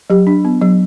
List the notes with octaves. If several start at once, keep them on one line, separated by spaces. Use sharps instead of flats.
F#3 G4
D4
B3
F#3